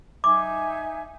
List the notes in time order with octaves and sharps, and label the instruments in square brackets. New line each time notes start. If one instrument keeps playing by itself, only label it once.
[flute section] D#4 E5 G#5 [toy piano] D6